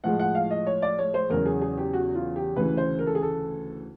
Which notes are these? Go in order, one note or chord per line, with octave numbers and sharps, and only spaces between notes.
A2 F3 G#3 F#5
F#5
F5
D#5
C#5
D5
C#5
C5
E2 C#3 F#3 A#4
G#4
G#4
G4
F#4
F4
G4
D2 C#3 E3 B4
C5
A#4
A4
G#4
A4